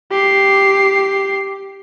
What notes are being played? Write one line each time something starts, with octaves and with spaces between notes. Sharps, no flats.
G4 C7